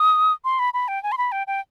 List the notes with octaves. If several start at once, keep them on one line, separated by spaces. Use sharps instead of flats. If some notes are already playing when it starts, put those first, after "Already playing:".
Already playing: D#6
C6
B5
B5
G5
G#5
C6
B5
G5
G5